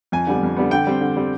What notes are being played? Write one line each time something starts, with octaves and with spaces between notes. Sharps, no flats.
F2 G#5
D3 G3 B3
F2
D3 G3 B3
D3 G5
G3 C4
D3
G3 C4